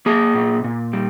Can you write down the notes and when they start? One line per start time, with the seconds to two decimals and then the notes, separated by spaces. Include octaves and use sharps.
0.06 A#3 G#4
0.34 A#2
0.64 A#2
0.93 G3